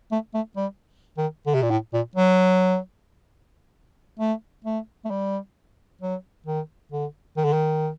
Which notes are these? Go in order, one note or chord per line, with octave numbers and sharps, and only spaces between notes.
A3
A3
G3
D#3
D3
C3
A#2
A2
A#2
F#3
A3
A3
A3
G3
F#3
D#3
D3
D#3
D3
D#3